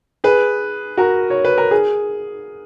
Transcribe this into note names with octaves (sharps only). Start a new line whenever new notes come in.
G#4 B4
F#4 A#4
C#5
B4
A#4
G#4